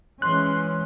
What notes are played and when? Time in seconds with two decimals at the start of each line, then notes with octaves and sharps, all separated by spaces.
0.22 E3 G#3 C#4 C6 F#6